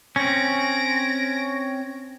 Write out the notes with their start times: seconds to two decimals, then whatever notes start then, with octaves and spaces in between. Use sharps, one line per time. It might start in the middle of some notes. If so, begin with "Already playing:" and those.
0.16 C4 C#4 A#6 D7